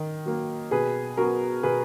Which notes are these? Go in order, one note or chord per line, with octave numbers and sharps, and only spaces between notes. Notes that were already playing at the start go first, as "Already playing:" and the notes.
Already playing: D#3
F#3 A#3
B2 G#4 B4
F#3 B3 F#4 A#4
B2 G#4 B4